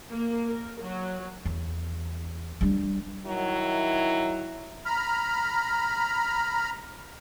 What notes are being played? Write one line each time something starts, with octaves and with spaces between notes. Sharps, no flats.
A#3
A#4
F#3
E2
G3 D4
D#3 F#3 E4
A#5 B5 F6